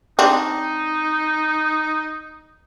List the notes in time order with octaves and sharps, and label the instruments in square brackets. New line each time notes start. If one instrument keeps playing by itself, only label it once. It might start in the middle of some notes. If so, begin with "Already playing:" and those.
[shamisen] C4 D4 [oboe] D#4